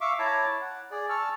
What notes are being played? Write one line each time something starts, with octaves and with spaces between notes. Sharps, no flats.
E5 F5 C#6 D6
E4 C#5 A5 A#5 D6
F#5
G#4 D5
A5 C#6 E6 F6